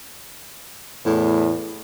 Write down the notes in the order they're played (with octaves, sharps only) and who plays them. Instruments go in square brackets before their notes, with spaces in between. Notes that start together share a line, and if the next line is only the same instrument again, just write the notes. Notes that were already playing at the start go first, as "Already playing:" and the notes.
[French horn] E2 [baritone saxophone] A2 [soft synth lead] E4